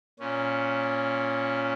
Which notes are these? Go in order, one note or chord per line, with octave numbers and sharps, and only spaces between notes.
A#2 C#4